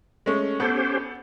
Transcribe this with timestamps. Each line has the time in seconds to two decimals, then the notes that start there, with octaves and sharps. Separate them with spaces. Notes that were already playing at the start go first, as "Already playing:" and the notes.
0.26 G#3 A3 C#4
0.60 B3 C#4 G4 A4 C5